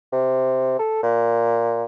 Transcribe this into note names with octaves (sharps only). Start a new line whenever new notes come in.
C3
A4
A#2